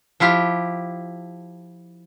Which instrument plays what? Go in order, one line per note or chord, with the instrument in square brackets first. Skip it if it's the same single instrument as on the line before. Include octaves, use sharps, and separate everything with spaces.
[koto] F3 E4 F4 G4